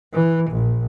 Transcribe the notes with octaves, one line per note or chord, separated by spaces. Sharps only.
E3
A#1